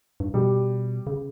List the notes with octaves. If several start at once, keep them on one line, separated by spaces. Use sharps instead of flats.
G2
B2 G3
C#3